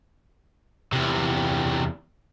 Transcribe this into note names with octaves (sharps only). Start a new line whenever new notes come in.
E2 C3